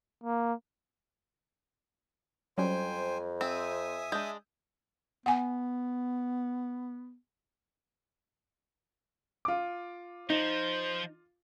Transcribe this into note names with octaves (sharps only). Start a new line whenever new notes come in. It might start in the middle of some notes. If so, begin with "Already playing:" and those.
A#3
F2 F#3 G3 C#4 C5 G5 G#5
C4 E5 G#5 D#6
G#3 D4 G6
B3 F#5 G#5
F4 D6
F3 D#4 C5